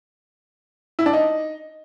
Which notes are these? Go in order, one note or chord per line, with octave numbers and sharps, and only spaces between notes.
E4
D4
D#4